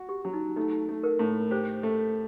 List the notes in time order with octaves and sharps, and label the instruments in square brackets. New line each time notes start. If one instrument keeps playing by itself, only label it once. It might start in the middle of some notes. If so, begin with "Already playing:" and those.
Already playing: [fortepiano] F#4
[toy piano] G4
[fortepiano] F#3
[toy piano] D#4
[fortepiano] A3 [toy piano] D#4
[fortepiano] A3
[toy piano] A#4
[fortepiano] A2
[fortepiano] G4 [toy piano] C5
[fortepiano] A3